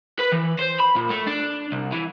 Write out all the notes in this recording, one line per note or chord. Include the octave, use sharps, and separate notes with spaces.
B4
E3
C5
B5
A#2
A3
D4
C2
E3